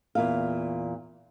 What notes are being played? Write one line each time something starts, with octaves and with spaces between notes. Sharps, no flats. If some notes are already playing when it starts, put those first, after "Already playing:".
E2 A#2 F5